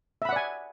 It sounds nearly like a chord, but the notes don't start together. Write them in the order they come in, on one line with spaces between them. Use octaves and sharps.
E5 B5 F#5 D5 G#5